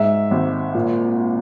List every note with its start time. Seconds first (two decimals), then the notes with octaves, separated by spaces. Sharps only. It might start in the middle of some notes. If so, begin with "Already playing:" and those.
Already playing: G#2 E5
0.31 G#1
0.75 A#2